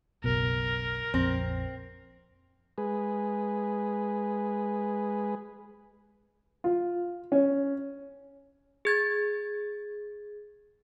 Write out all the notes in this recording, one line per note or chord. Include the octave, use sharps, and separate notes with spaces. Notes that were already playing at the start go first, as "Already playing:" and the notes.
F#1 B1 B2 A#4
A#1 F2 C4
G#3 G#4 B4
F4
C#4
G#4 G#6 A6